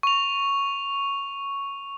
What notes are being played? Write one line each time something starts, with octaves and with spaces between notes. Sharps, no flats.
C#6 F7